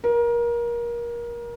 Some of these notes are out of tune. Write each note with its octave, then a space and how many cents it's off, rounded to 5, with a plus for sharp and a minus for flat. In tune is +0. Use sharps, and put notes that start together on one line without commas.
A#4 +25